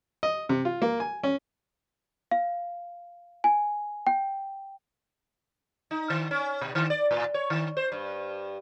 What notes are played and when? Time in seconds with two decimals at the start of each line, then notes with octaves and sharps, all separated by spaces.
0.23 D#5
0.49 C3
0.65 F4
0.82 A#3
1.00 G#5
1.24 C#4
2.31 F5
3.44 G#5
4.07 G5
5.91 D#4
6.10 D#3
6.31 C#4
6.61 B2
6.75 D#3
6.90 D5
7.11 A2
7.34 C#5
7.50 D#3
7.77 C5
7.92 G2